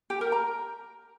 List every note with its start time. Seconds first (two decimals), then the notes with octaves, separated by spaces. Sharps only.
0.10 G4
0.21 A#4
0.32 A#5